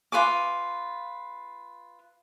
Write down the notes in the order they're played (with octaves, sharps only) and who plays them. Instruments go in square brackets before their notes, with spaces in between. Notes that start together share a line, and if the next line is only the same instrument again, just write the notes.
[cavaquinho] F4 B4 G#5 D6